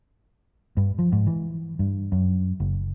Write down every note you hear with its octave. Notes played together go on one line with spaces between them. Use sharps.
G2
F3
G#2
E3
G2
F#2
F#1